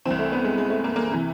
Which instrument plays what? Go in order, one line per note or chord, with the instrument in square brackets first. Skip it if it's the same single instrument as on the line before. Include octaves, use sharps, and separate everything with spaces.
[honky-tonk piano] C2 C3 E3 C4
A3
B3
G#3
G#3
A3
A#3
A#3
C3 E3